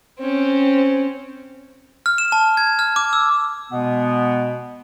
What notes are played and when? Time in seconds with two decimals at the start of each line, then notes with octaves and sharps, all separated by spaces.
0.19 C4 C#4
2.06 F6
2.18 E7
2.32 A5
2.57 G#6
2.79 F6
2.96 D6
3.13 E6
3.71 B2 G#3 B3